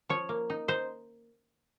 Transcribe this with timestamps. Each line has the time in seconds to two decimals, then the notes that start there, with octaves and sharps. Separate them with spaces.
0.09 F3 C#5
0.29 A#3
0.50 D#4
0.68 D#4 C5